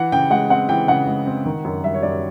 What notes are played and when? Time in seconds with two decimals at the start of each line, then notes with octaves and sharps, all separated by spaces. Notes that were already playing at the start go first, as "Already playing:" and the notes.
Already playing: E3 F#5
0.12 C#3 G5
0.30 G#3 F#5
0.50 C4 F#5
0.69 E3 G5
0.88 C#3 F#5
1.07 G#3
1.26 C4
1.45 D#3
1.65 F#2
1.84 G3 E5
1.94 C#5
2.02 F#2 D5